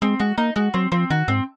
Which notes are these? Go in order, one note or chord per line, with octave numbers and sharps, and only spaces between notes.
G#3 C4
G#3 F#4
A#3 D#4
G#3 F#4
F#3 C4
F3 C4
D#3 F#4
G#2 C4